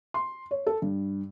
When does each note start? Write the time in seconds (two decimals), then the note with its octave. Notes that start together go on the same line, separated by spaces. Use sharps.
0.14 C6
0.51 C#5
0.67 A4
0.82 G2